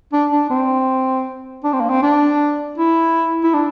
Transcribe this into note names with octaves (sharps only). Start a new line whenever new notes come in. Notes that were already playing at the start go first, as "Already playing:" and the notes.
D4
D4
C4
D4
C4
A#3
C4
D4
E4
E4
D4